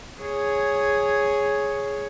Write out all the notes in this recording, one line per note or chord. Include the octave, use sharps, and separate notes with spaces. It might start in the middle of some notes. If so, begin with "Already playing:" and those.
G#4 C#5